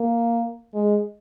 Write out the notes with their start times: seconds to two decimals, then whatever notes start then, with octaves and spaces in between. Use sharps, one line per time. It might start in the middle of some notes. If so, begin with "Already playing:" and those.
Already playing: A#3
0.74 G#3